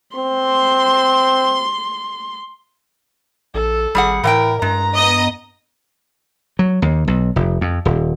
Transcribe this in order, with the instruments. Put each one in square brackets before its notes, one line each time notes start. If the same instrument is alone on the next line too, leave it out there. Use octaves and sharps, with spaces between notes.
[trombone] C4 [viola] C6
[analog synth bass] A#1 [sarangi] A4
[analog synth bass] G#1 [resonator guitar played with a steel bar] G3 G#4 F#5
[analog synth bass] A2 [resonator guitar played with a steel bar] E3 F#5 G5 [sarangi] A#4
[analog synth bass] G2 [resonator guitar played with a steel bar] G#3 [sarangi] A#5
[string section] B3 D#5
[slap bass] F#3
D#2
B1
F1
F2
D#1